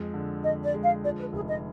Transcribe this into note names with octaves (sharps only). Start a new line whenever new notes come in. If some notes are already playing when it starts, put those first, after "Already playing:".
Already playing: F2 G#3
D3
D3 D#5
D5
G#3
F5
F3 D5
B4
F1 G#4
D#5